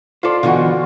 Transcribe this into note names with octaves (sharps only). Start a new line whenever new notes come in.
F4 A4 C5 D5
B2 D3 E3 F4 F#4